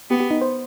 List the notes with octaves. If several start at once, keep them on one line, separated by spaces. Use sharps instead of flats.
B3 G4
G4
D#4
C5